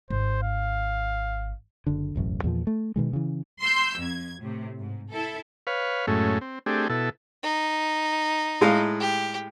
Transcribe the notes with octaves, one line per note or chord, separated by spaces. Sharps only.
G#1 C5
F5
F#1 D3
E1 A1 F#2
E2 A#2 F3
A3
B2 D#3 G#3
C#3 E3
C6 E6 G6
F2 G#6
A2 C3
G#2
E4 A4
B4 C#5 F5
F#2 A2 G#3 A3 C#4
C4
A3 C4 D4 G4 G#4
B2 E4 A4
D#4
A2 G#3 F5
G4